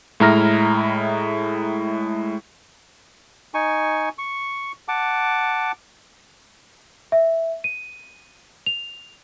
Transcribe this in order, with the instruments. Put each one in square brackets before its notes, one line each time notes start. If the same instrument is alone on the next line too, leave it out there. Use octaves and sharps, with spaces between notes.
[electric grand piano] A2 G#3 E4 A#5 F6 A#6
[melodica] D#4 G#5 C#6
C#6
F#5 A5 D6
[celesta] E5
D#7
F7